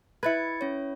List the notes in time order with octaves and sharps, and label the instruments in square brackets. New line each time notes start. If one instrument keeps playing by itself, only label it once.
[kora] E4 B4 [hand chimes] G#6 A6 C#7
[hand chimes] C#4 C#5